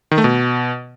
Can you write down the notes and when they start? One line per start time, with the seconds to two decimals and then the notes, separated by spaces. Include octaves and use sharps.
0.11 D#3
0.18 A3
0.24 B2